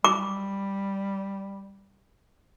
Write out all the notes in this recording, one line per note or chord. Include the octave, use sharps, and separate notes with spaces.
G3 D6